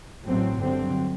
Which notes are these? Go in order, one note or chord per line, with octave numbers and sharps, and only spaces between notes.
A1 A2 F#3 C4
G2 D3 F#3 C4